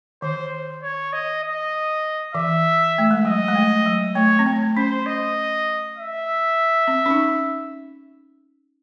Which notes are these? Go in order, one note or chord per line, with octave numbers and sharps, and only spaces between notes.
D#3 C5
C#5
D#5
D#5
E3 E5
A3
G#3
F#3 D#5
G#3
A3
F#3
A3 C#5
C4
A3
C#4 C5
D#5
E5
C4
C#4
D#4